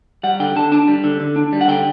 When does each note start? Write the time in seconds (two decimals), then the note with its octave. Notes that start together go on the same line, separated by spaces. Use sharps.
0.23 G3 F#5
0.40 D3 G5
0.56 D3 A5
0.72 D4 A5
0.88 G3
1.04 D3
1.20 D3
1.36 D4
1.53 G3
1.61 F#5
1.68 D3 G5